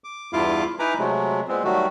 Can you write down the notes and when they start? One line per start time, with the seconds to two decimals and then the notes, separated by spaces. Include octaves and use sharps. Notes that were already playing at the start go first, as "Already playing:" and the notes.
0.04 D6
0.33 E2 G2 E4 F4 F5 D6
0.79 D#4 E4 B4 G#5 A#5 D6
0.98 C3 F#3 G#3 A3
1.48 A#2 G#3 B3 C4
1.64 D#3 F#3 G3 A3 F#4